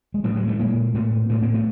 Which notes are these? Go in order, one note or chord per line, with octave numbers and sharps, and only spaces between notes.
G#3
A2 F3 G3
F#3 G#3
G3 A3
A#2 G#3 A#3
A2 A3 B3
A2 A3 B3
A#3 C4
A3 B3